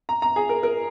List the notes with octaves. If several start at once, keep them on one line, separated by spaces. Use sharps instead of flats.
A#5
A#5
G#4
A#4
A#4